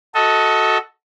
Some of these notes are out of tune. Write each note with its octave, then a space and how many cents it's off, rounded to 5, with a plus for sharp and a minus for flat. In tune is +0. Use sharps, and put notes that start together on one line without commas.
F#4 +0 A4 +0 D#5 +25